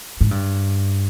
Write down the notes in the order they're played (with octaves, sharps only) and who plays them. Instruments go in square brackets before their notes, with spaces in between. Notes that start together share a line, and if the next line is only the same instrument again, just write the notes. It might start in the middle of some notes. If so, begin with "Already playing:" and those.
[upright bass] G#2
G2